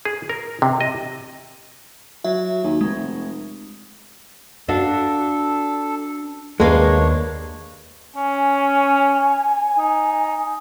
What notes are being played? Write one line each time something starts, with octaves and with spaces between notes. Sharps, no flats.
G#4
A#4
C3
D#5
F#3 E5
D#2
F1 G#3
D4 F#4 A4 F5
D#2 G#3 A#3 D4 B4 C#5 F5
C#4 G#5
D#4